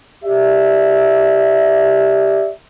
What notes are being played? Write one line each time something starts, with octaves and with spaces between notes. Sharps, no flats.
G4 D5 E5